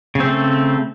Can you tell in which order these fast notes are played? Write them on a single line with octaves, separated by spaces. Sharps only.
C#3 C4 A3